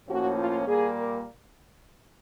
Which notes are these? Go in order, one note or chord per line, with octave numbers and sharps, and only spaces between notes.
A2 F3 A#3 C#4 F#4
F4
A#2 G3 A#3 G#4
A#4